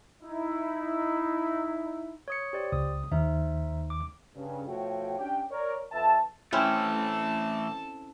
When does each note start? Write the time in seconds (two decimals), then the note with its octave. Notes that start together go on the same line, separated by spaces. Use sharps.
0.22 D#4 E4
2.28 C#5 D#6 C#7
2.53 G4 C5 D5
2.72 C#2 D#6
3.12 D#2 D#4 C5 E5
3.90 D6
4.36 G2 C#3
4.67 B2 F3 A3 F#4 C#5 G5
5.19 C#4 D4 G4 G5
5.51 A#4 C#5 D5
5.92 F2 B4 E5 A5
6.53 A2 E3 A3 C4 C#4 E4 A4 A5